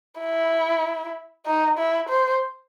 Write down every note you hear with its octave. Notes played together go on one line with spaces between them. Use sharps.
E4
D#4
E4
C5